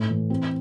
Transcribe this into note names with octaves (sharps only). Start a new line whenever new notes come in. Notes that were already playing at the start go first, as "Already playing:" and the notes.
Already playing: A2
E3
C4